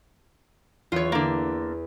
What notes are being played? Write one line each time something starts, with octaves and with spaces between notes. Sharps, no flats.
E2 F4 C#5
D3 A#3